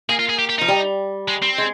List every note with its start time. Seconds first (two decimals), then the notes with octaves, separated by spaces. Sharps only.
0.09 A#3 G#4
0.19 F4
0.29 G#4
0.39 G4
0.50 G4
0.59 F3 D#4
0.68 G3
1.28 G#3
1.42 C4
1.58 G#3